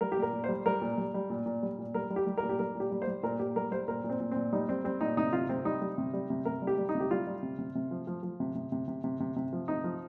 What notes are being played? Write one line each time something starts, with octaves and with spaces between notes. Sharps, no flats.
G3 A#4
G4
A#2
A#4
A#2
C5
G3
G3 A#4
A#2
G3
G3
A#2
A#2
G3
A#2
G3 A#4
G3
G4
G3
A#4
A#2
G4
G3 A#4
A#2 G4
G3
C5
G3
A#2 A#4
A#2 G4
G3 A#4
G3 C5
A#2 A#4
A#2
C4
A#2
A#2 C4
G3 D#4
G3 C4
G3 C4
A#2 D#4
C3 D#4
C3 F4
C3 C4
G3 D#4
G3
C3
G3
C3
C3 A#4
G3
G4
G3
D#4
C3
G4
G3 F4
G3
C3
C3
C3
F3
F3
F3
C3
C3
C3
C3
C3
C3
C3
F3
C3 D#4
F3